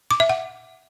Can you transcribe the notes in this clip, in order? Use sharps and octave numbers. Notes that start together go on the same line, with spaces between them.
D6
E5
F#5